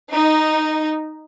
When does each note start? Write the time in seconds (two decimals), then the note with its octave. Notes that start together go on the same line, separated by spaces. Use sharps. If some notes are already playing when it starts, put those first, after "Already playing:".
0.13 D#4